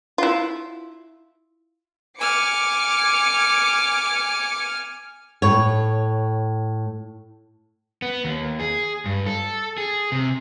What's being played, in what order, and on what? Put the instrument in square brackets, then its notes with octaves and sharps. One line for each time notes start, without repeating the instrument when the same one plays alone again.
[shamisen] E4 F4
[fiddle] G#5 F6 [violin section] D6 C#7
[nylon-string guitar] A2 C#5
[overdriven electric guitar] B3
D#2
G#4
G2
A4
G#4
C3